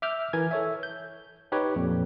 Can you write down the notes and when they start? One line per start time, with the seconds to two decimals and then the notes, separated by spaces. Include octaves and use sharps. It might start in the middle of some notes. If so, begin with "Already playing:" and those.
0.02 E5 D6 F6 G6
0.33 E3 A#4 G#5 G#6
0.51 A4 C#5 E5
0.83 G6
1.52 D#4 G4 B4 C#5
1.76 F2 A#2